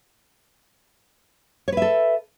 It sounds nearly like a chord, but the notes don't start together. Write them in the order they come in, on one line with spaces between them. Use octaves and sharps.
C#5 B4 E5 A4